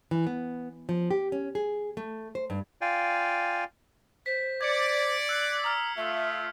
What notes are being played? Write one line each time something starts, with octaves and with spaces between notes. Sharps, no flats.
E3
B3
F3
G4
C#4
G#4
A3
C5
G2
F4 D5 F5 G5 G#5
C5 B6
D5 G#6 C#7
E6 F#6 C7
A#5 D#6 F6
A3 F4 E5